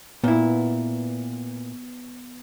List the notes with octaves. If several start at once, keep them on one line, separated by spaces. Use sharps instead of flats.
A#2 B3 E4